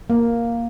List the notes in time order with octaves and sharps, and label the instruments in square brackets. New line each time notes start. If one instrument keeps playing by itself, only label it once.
[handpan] A#3